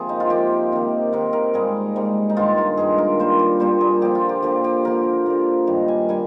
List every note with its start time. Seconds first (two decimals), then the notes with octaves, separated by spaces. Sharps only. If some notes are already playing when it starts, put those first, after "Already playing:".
Already playing: C3 F3 A#3 G#4
0.09 D#4
0.20 F4
0.30 C3 F3 A#3 G4
0.72 C3 D#3 A#3
1.12 C3 D#3 A#3 A#4
1.33 A#4
1.54 G#2 G3 A#3 G#4
1.96 G#2 G3 A#3
2.30 D#4
2.37 G2 D#3 G#3 F4
2.58 F4
2.77 G2 D#3 G#3 G#4
2.98 A#4
3.19 A#2 G3 A#3 C5
3.39 D5
3.60 A#2 G3 A#3 C5
3.81 G#4
4.01 D3 F3 A#3 G4
4.15 F4
4.29 G4
4.42 D3 F3 A#3 G4
4.64 G4
4.85 D3 F3 A#3 A#4
5.26 D3 F3 A#3
5.67 G2 D#3 G3 A#3
5.88 G#5
6.09 D#3 G3 A#3 G#5